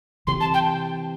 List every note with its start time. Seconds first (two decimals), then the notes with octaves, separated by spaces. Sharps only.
0.27 C3 E3 C6
0.40 A5
0.54 G5